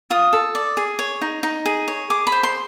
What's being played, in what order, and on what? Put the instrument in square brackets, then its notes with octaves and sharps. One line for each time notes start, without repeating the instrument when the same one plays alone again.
[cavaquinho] F4 D#6
A4
D5
G#4
C#5
D#4
D#4
G#4
C#5
G#4 D6
B5
C5
C6